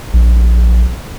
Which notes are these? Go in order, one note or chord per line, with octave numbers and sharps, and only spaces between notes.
A#1